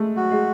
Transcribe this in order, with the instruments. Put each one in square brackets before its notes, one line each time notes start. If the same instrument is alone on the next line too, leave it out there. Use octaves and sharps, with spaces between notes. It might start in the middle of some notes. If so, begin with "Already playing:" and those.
Already playing: [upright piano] G#3 A3
[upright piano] F#3 [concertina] F#4
[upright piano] G#3